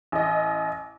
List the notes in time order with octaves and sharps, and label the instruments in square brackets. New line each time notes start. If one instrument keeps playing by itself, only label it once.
[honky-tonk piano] A1 D#5